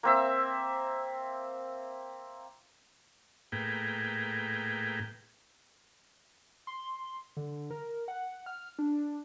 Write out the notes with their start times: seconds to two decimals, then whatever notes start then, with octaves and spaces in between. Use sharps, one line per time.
0.03 A#3 C4 E5
3.52 A2 A#3 G#4 B4 G5
6.67 C6
7.37 D3
7.71 A#4
8.08 F#5
8.46 F6
8.79 D4